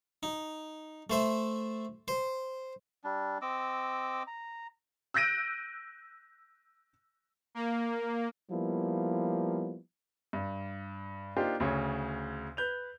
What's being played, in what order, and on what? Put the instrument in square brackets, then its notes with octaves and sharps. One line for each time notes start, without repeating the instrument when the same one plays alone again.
[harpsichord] D#4
A3 C5 E5
C5
[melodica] G3 D4
C4 D#5 D6 E6
A#5
[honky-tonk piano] E6 F#6 G6 A#6 D7 D#7
[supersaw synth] A#3
[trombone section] F3 G3 A#3 B3 E4
[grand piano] G2
A#3 D4 D#4 F4 G4 C5
D2 C#3 C#5
B4 G6 F7